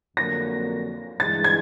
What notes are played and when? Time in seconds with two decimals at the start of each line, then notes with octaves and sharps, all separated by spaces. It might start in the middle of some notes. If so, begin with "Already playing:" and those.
0.17 F2 D3 F#3 A#3 A#6
1.20 G2 E3 G#3 A6
1.44 G#6